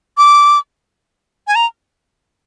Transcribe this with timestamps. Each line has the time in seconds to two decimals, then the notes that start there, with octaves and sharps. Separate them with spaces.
0.18 D6
1.47 G#5
1.55 A#5